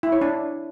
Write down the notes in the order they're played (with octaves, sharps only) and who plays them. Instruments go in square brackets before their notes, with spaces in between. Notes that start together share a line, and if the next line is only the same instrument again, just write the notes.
[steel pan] E4
C#5
D4